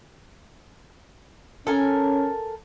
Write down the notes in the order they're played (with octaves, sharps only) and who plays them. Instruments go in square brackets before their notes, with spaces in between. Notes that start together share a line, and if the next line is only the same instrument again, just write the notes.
[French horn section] C#4 [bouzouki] A4 A#4 G#5